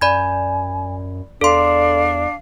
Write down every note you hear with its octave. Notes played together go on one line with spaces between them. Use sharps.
F#2 D5 G#5 B5 G#6
E2 D4 A4 D5 F5 C6